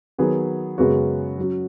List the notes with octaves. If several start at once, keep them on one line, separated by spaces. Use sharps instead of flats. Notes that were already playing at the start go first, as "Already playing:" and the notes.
D#3 F#3 B3 G#4
F#2 C#3 G#3 B3 F#4
F#3 C#4 F#4